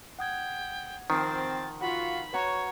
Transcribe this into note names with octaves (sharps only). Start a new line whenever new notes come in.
F#5 G5 D#6 G#6
D#3 F3 C4 A6
F4 F#4 B5
F#4 B4 C#5 F#5 A#5